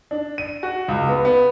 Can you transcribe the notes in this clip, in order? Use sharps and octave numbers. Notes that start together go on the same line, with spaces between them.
D4
D#7
F#4
C#2
B3
B3